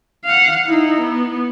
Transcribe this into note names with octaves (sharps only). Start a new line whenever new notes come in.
F5 F#5
D#4 E4
B3